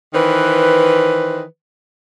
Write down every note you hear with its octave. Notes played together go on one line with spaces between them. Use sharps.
D#3 E3 B4 C5